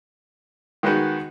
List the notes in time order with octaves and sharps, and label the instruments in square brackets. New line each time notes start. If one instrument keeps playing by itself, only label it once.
[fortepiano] D#3 G#3 B3 D#4 F#4